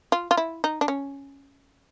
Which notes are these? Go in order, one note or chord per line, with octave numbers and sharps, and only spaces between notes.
F4
F4
E4
D#4
D4
C#4